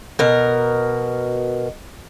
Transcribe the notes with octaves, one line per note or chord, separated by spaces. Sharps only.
B2 A#4